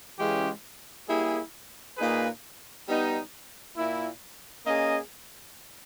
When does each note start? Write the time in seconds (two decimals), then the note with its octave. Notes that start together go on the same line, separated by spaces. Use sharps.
0.18 C#3 E3 G#3 C#4 G4
1.08 G3 A#3 E4 G#4
1.98 A#2 A#3 D#4 G#4 B4
2.87 G3 B3 D#4
3.77 A#2 A#3 E4
4.66 A#3 C#4 G#4 D#5